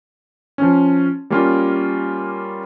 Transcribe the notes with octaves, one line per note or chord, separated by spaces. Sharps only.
F3 C#4
G3 A#3 C#4 F4